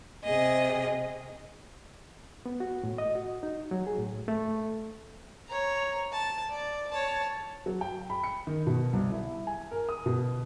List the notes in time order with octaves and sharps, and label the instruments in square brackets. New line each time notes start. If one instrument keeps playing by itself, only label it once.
[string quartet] C3 G#4 D#5
[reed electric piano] B3
F#4
A2
D#5
F#4
D#4
F#3
G#4
A2
A3
[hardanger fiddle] C#5 A#5
A5
D5
C#5 A5
[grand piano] F#3
G5
B5
C#7
D#3
B2
C2
E4
G#5
A#4
D#6
B2